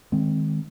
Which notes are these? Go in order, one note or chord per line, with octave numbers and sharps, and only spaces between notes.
D#3 G#3 C4